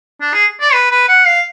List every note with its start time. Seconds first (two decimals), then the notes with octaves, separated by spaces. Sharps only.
0.21 D4
0.34 G#4
0.61 D5
0.73 B4
0.91 B4
1.09 F#5
1.26 F5